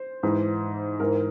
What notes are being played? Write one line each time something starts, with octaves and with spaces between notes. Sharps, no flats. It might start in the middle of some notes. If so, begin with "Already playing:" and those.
Already playing: C5
G#2 E3
G#2 E3 A#4